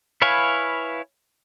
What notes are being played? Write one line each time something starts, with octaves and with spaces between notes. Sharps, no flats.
E4 B4 C#5 F5 G#5